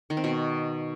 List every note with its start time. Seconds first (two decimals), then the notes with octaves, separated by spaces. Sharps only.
0.10 D#3
0.17 C4
0.24 B2